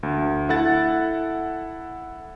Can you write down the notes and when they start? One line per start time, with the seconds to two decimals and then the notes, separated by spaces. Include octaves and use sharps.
0.03 D2
0.49 E4 A4 F#5 A6